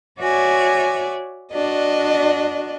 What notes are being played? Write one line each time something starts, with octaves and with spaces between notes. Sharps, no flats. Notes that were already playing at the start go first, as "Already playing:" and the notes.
F#4 C#5 D5 E5 G#5
D4 F#4 D5 D#5